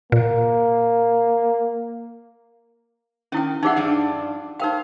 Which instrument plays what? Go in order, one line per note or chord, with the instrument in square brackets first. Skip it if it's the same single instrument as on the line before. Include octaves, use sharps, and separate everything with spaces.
[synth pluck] A#2 [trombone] A#3
[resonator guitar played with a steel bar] D#3 [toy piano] C#4 E4 G5
[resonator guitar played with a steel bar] E3 G3 [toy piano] D#4 G#4 F#5
[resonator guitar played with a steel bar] G2 F3 D4
[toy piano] D#4 A#4 G5 [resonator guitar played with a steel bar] C5 F5